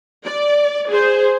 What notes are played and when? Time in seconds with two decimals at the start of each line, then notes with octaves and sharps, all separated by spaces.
0.24 D5
0.88 G#4 C5